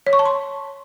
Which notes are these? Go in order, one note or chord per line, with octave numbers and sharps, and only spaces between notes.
C#5
C#6
A5
C6